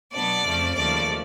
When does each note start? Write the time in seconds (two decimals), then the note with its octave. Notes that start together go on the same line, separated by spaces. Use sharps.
0.12 B2 F#3 B3 D4 D5
0.44 F2 C#3 F3 A3
0.76 D#2 C#3 F3 A3 D5